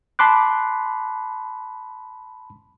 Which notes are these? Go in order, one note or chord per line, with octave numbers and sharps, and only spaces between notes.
A5 B5 C6 D6 F#6